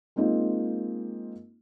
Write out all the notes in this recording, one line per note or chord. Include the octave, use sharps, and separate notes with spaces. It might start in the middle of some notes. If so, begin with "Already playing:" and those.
G#3 A#3 C4 D#4 F4